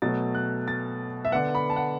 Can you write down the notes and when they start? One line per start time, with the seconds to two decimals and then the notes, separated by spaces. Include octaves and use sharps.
0.02 B2 F#3 A3 A6
0.35 F#6
0.68 A6
1.25 E5
1.32 D3 B3 F#5
1.55 B5
1.70 A5
1.76 F#5